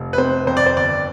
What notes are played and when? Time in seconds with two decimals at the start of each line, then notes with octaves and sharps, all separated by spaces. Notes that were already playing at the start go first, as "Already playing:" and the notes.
Already playing: F1
0.13 B4
0.18 C3 C5
0.47 F2 C5
0.57 D5
0.66 C5
0.76 G1 D5